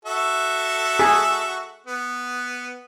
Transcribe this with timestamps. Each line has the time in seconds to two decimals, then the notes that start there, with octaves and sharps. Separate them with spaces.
0.05 F#4 A4 E5
0.99 G#4
1.86 B3